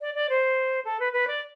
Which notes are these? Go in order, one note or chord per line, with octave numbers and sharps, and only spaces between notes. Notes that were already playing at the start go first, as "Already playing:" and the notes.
D5
D5
C5
A4
B4
B4
D5